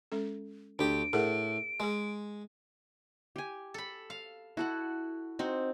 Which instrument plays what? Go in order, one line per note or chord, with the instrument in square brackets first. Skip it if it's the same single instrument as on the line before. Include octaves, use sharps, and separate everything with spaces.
[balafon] G#3 C#4 A4
[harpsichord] D2 G4 [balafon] D4 [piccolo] D7
[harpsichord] A2 [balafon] G#4 A#4 F#5
[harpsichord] G#3 [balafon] G#4 G#5
[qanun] G4 G#5
[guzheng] A4 B5
F5
[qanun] E4 A4 F#5 [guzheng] F#4
[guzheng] C4 [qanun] D#4 F#4